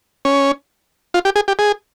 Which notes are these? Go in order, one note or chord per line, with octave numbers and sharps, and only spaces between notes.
C#4
F4
G4
G#4
G4
G#4